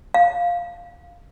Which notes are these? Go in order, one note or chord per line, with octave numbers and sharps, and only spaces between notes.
F5